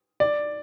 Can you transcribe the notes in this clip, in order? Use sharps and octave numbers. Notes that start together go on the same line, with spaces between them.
D5